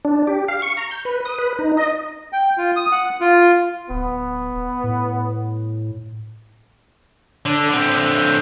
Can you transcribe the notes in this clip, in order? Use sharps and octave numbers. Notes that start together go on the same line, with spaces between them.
D4
G4
F5
C#6
A#5
G6
B4
D#6
B4
D#4
D#5
G5
F4
D#6
F#5
F4
D1 B3
A2
D3 D4
D3 C4